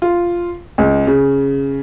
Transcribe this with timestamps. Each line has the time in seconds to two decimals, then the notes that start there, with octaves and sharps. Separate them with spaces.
0.02 F4
0.78 C#2
1.07 C#3